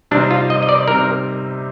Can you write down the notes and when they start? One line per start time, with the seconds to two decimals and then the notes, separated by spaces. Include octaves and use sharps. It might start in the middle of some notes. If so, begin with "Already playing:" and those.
0.11 C3 G3 C4 D4 D#4
0.31 F4
0.50 D#5
0.63 D#5
0.69 D5
0.88 C3 G3 C4 D#4 A#4